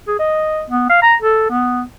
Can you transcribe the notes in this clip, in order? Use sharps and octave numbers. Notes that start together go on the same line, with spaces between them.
G#4
D#5
B3
F5
A#5
A4
B3